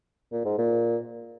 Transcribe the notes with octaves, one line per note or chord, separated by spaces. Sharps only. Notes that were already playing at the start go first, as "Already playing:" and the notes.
A#2
G#2
A#2